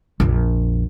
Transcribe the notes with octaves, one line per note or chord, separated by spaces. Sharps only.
A#1 F2